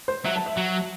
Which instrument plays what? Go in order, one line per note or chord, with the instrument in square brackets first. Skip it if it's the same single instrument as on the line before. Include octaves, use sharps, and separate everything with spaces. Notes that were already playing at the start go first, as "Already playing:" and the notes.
[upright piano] C5
[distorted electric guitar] F#3 [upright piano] E5
[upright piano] A5
E5
[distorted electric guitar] F#3